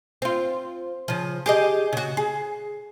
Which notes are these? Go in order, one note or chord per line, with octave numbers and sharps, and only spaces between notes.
C4 F4
C#3 F3
G4 G#4 D#5
C#3 F#4
G#4